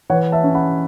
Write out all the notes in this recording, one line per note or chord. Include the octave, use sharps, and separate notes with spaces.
E3 C#5 F#5
E5 A5
C#4
F#5 B5